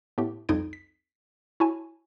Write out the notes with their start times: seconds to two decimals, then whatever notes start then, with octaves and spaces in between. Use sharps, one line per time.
0.18 A2 B3 G4
0.49 C2 F2 D#4 G#6 D7
0.73 B6
1.60 E4 F#4 C#5 G#5 A5